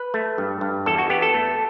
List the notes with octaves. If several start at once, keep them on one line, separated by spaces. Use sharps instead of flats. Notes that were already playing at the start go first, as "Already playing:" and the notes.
Already playing: B4
A3
G2
G2
E2 A4
F#4
B3 G4
A4
A3